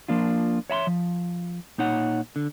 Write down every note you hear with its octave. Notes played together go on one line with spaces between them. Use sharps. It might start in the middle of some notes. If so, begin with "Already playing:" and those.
F3 A#3 D4 F4
C#5 E5 B5 C6
F3
A#2 D#4 C#5 F#5
D3